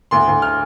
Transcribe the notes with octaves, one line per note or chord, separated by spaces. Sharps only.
D2 C6
D2
F6